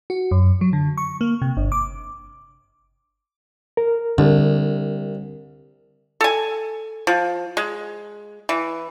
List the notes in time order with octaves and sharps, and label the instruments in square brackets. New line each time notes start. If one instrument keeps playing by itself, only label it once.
[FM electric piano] F#4
F#2
F#3
D3
C#6
A#3
C3
G1
D6
[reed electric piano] A#4
[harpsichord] C2 [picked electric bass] D3
[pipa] A4 G#5
F3
G#3
E3